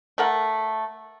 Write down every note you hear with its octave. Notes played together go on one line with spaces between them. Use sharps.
A3 A#4 F#5